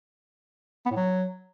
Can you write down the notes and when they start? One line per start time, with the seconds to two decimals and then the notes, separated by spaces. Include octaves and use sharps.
0.85 B3
0.91 A2
0.96 F#3